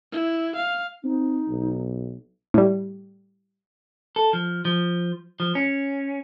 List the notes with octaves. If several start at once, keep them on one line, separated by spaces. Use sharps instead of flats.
E4
F5
C4 D#4
B1
A2 G3
A4
F3
F3
F3
C#4